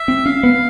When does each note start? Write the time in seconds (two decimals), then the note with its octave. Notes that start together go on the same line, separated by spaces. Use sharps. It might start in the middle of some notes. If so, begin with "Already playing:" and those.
Already playing: E5
0.08 C4
0.26 C#4 F5
0.43 B3